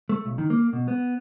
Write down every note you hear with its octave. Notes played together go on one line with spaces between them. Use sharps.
A3
B1
D#3
A#3
B2
B3